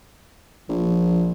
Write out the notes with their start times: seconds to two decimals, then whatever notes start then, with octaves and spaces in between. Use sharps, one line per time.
0.69 A#1 F3